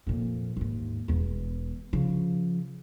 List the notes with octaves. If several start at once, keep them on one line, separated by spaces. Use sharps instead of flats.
F2 A#2
D#2 G#2
E1 E2
C#3 F3